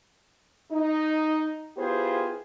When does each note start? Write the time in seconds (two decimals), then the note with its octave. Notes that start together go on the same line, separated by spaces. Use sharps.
0.71 D#4
1.77 B3 E4 F4 G4 G#4 C5